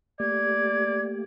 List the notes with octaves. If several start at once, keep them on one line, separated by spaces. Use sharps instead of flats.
A3 A#3 G4 D5 G#6